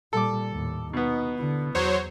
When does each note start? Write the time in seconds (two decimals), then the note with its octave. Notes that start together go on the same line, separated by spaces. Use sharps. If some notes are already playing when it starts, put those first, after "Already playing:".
0.13 A#2 G3 A4 D6
0.49 D#2 A2
0.93 B2 B3 D#4
1.39 D3 E4
1.75 E2 F#3 C5 C#5